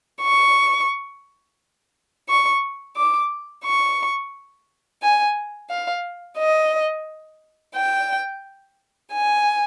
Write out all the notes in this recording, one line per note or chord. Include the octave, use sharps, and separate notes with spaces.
C#6
C#6
D6
C#6
G#5
F5
D#5
G5
G#5